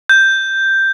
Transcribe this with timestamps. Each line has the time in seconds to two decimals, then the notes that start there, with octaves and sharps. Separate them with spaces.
0.09 G6